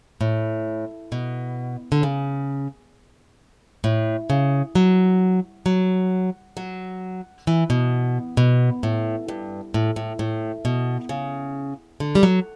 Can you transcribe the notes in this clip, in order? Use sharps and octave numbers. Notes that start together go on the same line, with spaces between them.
A2
B2
D3
C#3
A2
C#3
F#3
F#3
F#3
E3
B2
B2
A2
G2
A2
A2
A2
B2
C#3
D3
G3
F#3